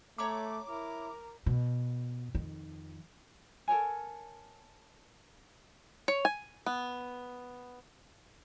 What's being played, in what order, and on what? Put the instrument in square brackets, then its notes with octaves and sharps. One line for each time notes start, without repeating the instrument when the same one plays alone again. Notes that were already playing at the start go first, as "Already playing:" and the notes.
[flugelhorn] A3 [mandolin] C#5 A#5 B5 [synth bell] D6
[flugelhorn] E4 [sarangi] A#4
[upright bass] B2
F2 D#3
[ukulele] A4 A#4 C#5 G#5
[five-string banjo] C#5
G#5
B3